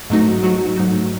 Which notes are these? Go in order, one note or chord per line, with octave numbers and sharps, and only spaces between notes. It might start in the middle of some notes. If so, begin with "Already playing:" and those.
G#2 F#3 A3 D#4 F#4
G#2 F#3 A3 D#4 F#4
G#2 F#3 A3 D#4 F#4